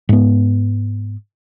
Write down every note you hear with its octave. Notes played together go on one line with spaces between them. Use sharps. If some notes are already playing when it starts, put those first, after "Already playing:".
G#2 B3